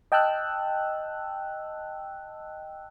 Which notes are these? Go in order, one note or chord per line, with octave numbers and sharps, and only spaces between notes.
D#5 G5 A5 E6 F#6